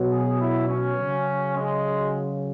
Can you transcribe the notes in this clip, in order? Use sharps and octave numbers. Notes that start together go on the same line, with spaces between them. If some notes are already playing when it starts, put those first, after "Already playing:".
Already playing: B2 F#3
G#4
E4
C#4
C#3 F#3
G#3